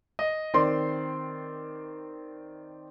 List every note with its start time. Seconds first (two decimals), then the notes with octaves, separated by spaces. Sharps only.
0.19 D#5
0.54 D#3 C4 D5 C6